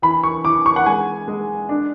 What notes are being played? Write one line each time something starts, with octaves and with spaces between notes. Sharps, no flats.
E3 B5
C#6
E3 D6
C#6
F#5
G#3 G#5
G#3
D4